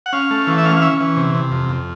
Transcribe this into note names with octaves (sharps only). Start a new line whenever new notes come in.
F#5
C#4 F5
A3
E3
E5
C#4 F5
F5
C#4 E5
E3
C3
C3
F2
F2